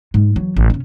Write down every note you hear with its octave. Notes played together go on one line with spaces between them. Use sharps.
G#2 G#3
E3 F#3
A1
C3 C#4